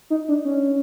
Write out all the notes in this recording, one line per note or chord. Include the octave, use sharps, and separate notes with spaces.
D#4
D4
C#4